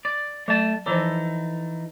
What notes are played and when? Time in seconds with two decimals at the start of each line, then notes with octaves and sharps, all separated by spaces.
0.05 D5
0.48 F#3 A3 A5
0.86 E3 F3 D#4 A4 C5